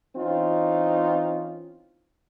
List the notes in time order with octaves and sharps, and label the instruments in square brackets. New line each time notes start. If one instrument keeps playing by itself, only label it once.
[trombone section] E3 C4 C#4 D#4 F4